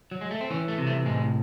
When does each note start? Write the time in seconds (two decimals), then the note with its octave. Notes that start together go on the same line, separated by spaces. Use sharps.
0.11 F#3
0.21 G#3
0.31 A3
0.41 C4
0.50 E3 C#4
0.68 A3
0.78 C3
0.87 A3
1.05 A2 G#3